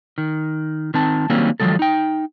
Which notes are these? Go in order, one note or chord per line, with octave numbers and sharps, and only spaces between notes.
D#3
D#3 C4 A5
D#3 F#3 G3 A#3 C4 C#4
D#3 F3 F#3 G#3 A4
D#4 G5